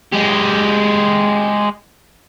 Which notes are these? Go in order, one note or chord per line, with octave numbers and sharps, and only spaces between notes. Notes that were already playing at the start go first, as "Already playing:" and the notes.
G#3 G4